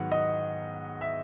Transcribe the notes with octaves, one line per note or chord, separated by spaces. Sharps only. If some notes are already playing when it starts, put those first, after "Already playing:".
Already playing: G#2 D#3 F#3 B3 F#5
D#5
E5